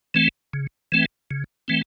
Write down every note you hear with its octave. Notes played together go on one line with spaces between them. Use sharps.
E3 A3 C4
C#3
E3 A3 C4
C#3
E3 A3 C4